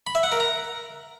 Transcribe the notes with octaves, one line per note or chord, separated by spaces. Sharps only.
B5
E5
F#5
A#4
A#5